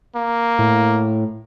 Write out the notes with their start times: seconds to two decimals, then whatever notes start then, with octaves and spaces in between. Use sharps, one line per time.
0.15 A#3
0.59 A2